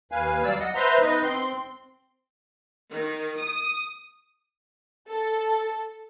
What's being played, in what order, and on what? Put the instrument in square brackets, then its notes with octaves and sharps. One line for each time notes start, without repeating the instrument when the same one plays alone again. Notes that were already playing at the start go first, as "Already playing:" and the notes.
[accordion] D#2 B4 F5 G#5
F#3 G3 D5 F5 E6
D#5 F#5
B4 C5 E5 A#5 C6
B3 D#4 B4 D#5
C4 C6
[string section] D#3
D#6
[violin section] A4